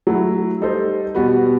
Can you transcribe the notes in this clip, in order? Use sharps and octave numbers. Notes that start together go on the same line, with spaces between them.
F#3 A3 E4
G3 D#4 A4 C5
B2 G3 B3 F#4 B4